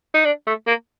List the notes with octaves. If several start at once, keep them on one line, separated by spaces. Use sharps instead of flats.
D#4
D4
A3
A#3